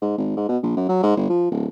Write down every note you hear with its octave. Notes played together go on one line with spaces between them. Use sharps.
G#2
G#1
G#2
B2
A#1
F#2
F#3
G#2
G1
F3
D1